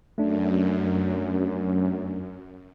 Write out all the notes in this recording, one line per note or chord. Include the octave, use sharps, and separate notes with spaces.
F#2 A3 D4